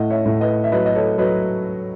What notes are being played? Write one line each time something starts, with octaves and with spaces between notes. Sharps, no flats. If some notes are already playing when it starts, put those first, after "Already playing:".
Already playing: A2 D#5 F#5
C#5 E5
A2
B4 D#5
E5
F#3 B4 D#5
D#5
A4 C#5
F#3 B4 D#5